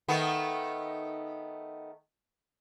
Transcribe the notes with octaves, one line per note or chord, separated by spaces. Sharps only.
D#3 A3 B3